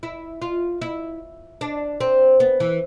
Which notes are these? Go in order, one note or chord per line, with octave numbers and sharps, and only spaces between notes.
E4
F4
E4
D4
C4
B3
E3